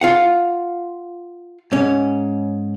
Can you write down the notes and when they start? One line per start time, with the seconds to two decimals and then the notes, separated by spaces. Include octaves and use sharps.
0.01 F4 F5 F#5
1.72 G#2 C#4